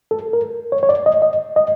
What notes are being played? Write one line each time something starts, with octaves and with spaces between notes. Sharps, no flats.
A4
A#4
C#5
C#5
D5
D#5
D#5
D#5